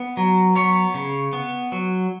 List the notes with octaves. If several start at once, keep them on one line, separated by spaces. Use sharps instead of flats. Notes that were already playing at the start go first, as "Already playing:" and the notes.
Already playing: B3
F#3
B3 C#5
C#3
B3
F#3